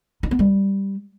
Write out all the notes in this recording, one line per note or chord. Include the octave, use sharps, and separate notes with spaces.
D#4
B3
G3